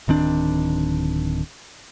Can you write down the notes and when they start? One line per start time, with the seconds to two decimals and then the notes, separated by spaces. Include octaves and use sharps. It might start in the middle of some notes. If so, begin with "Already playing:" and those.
0.08 D1 D#3 C4 D4